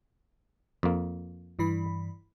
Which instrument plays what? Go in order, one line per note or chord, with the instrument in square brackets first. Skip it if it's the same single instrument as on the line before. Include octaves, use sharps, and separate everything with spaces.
[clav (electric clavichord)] F2 A#3
[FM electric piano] G2 E3 B5